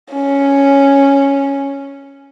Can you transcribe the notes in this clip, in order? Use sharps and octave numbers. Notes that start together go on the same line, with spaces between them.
C#4